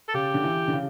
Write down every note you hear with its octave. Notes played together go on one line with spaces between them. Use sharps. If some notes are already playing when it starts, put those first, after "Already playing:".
A4
C#3 G4
D3
E3
D3
C#3